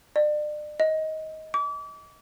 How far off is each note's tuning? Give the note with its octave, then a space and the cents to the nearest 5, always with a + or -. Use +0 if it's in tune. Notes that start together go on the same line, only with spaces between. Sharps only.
D5 +35
D#5 +15
D6 -35